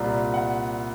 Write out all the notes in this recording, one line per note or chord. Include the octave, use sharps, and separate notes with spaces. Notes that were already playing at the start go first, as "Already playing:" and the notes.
Already playing: C2 A#2 G3
F#5